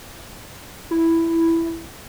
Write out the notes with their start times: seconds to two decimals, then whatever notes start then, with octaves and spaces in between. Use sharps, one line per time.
0.91 E4